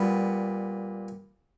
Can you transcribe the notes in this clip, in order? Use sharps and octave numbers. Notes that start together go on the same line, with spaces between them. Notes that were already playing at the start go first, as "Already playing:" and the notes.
Already playing: A#2 G3 B3